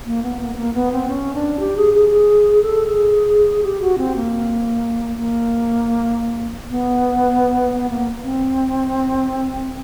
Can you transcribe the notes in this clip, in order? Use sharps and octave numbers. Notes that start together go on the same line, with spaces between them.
A#3
B3
A#3
B3
A#3
B3
C4
C#4
D4
G4
G#4
G#4
A4
G#4
G4
F#4
C4
A#3
A#3
B3
B3
A#3
C4